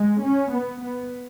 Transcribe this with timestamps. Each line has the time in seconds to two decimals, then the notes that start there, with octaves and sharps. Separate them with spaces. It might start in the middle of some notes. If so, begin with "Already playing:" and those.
Already playing: G#3
0.23 C#4
0.53 B3
0.83 B3